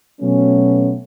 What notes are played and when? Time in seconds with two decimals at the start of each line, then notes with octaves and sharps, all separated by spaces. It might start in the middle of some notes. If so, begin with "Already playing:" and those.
0.21 B2 F#3 A3 B3 C#4